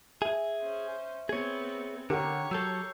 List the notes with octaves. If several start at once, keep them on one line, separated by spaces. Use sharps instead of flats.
G#4 E5
C#4 C5
B3 C4 G#4 C#5
D3 G4 A#4 C#5 F#5 G5 A#5
F#3 A4 E6 G6 C7